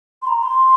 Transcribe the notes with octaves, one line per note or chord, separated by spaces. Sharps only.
C6
A#5
C6